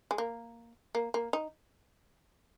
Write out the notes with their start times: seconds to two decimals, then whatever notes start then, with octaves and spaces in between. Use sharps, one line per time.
0.11 G#3
0.18 A#3
0.95 A#3
1.14 A#3
1.33 D#4